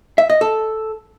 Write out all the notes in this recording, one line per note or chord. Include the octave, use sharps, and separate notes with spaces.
E5
D#5
A4